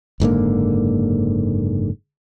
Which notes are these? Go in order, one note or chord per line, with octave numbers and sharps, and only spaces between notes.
F#1 G#2 D3 A#3